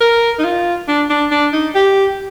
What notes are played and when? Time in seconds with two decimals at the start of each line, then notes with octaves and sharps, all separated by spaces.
0.01 A#4
0.39 D#4
0.44 F4
0.88 D4
1.10 D4
1.31 D4
1.53 D#4
1.75 G4